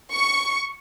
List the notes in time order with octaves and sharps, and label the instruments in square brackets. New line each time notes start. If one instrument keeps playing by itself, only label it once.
[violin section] C#6